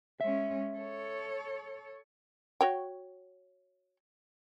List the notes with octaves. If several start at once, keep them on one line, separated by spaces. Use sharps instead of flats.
G#3 C#4 E5
A4 C#5
F#4 C#5 G5